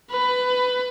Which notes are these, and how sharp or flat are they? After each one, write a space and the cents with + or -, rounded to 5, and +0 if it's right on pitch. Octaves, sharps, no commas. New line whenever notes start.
B4 +20